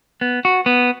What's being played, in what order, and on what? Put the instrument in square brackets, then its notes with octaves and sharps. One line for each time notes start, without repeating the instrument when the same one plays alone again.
[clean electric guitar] B3
F#4
B3